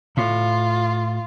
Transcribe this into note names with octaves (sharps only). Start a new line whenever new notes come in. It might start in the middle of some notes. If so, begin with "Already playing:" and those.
A2 F4